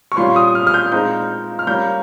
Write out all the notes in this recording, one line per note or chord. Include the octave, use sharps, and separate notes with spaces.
C#6
A#2 G3 C#4 F4 C6
D#6
F6
F6
G6
A#2 G#3 C4 D#4 G6
F6
G3 A#3 C#4 G6